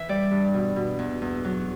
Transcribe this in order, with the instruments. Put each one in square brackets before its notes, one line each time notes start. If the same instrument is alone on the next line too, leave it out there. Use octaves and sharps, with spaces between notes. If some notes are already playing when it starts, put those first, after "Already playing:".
Already playing: [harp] E3 E5
G3 D5
G2
B2
B2
E2
E2
F#3